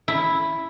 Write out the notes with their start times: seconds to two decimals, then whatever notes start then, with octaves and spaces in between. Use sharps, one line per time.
0.08 E4